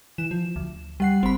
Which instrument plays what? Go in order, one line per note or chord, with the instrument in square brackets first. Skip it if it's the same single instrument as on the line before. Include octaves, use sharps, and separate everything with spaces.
[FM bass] E3 [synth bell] E7
[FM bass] F3
D2
[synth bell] G3 F#5 C7
[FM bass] F#1 [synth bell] C4 B5